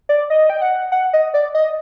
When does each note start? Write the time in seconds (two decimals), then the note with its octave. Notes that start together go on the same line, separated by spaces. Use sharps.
0.09 D5
0.30 D#5
0.50 G5
0.62 F#5
0.92 F#5
1.13 D#5
1.34 D5
1.55 D#5